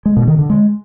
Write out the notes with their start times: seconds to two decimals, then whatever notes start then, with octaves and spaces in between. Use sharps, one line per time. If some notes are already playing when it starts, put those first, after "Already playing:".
0.06 G#3
0.17 B2
0.28 D#3
0.39 D3
0.50 G#3